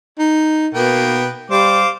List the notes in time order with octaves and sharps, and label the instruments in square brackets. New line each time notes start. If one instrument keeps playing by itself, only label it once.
[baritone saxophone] D#4
[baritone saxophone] B2 [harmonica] A#3 B3 G5
[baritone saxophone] G3 [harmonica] C5 F5 D6